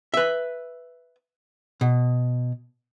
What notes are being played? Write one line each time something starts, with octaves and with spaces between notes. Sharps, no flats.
B4 E5
B2